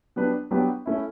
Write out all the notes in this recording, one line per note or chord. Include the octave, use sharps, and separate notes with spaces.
F#3 B3 D4 G4 B4
F#3 B3 D4 G4 B4
A3 C#4 E4